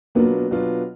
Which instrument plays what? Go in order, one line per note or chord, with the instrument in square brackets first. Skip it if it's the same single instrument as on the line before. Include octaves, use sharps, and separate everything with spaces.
[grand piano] B2 F#3 B3 D4 F4 [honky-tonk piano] A#3
[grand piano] B2 F#3 B3 D4 F4